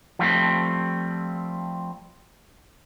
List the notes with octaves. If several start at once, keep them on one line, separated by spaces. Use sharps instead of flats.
F3 G3 A3 C4